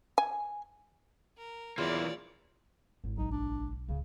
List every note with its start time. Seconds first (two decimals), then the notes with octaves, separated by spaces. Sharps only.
0.18 G#5
1.38 A#4
1.78 E2 E3 A#3 F4 C#5 D5
3.04 G#1 E4
3.18 B1 D#4
3.32 D4
3.88 D1 C#2 C#3